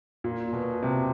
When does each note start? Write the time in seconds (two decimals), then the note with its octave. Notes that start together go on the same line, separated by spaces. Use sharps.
0.24 A#2
0.53 B2
0.83 C3